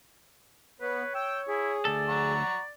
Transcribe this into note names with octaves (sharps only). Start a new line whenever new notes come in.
B3 B4 C#5
G5 E6
E4 G#4
D2 A4 D5
F#5 A#5 C#6